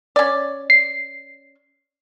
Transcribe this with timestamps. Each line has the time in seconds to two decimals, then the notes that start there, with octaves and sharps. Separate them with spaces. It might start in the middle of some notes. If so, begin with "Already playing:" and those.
0.16 C#4 D5
0.70 C7